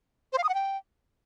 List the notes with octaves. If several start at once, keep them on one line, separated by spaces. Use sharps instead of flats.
C5
F5
D#6
F#5
G5